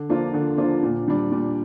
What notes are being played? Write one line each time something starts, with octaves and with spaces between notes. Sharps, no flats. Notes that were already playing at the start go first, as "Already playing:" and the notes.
Already playing: D3
F3 A#3 D4 F4
D3
F3 A#3 D4 F4
A#2
G3 D4
A#2